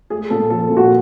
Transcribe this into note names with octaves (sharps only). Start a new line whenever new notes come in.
A3 G#4
A#2 A4
F3 A4
A#2
F#4